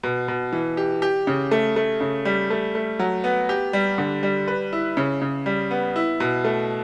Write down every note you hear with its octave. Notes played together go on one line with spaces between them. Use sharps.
B2
B2
E3
G4
G4
C#3
A3
A3
C#3
G3
A3
A3
F#3
B3
G4
G3
D3
G3
B4
E4
C#3
C#3
G3
B3
E4
B2
A3